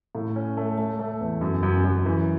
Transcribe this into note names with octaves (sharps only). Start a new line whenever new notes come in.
A2
C#4
A3
A3
A3
E2
F#2
F#2
F#2
E3